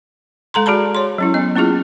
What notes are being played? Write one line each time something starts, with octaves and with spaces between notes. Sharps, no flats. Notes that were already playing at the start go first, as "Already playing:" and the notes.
G#3 A4 A#5 C6
F#4 G#4 D5 A5 B5
C#5 C6
F#3 C#4 E4
B3 D#5
A#3 C#4 E4 F4 G#4